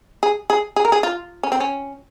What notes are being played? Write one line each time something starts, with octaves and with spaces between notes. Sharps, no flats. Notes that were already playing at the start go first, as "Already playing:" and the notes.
G#4
G#4
G#4
A#4
G#4
F4
C#4
C4
C#4